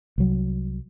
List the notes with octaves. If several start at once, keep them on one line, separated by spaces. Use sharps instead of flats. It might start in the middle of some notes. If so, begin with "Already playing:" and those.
C2 F#3